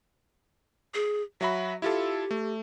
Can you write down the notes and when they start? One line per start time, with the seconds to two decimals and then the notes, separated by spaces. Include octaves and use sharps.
0.94 G#4
1.41 F#3 F#4 E5 B5
1.82 E4 F4 G4 A4
2.31 A3